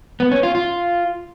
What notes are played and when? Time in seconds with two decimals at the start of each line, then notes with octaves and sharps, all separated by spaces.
0.20 B3
0.32 C#4
0.43 F4
0.55 F4